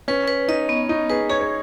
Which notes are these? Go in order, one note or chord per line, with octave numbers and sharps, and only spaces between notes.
C#4 B4
B4
D#4 D#5
B3
B3 D#4
G#4 B4
G#4 C#5
C#5